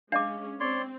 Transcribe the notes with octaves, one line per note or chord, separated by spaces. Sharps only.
G#3 C#4 D4 D#5 F5 D6
C4 C#5 D5 C6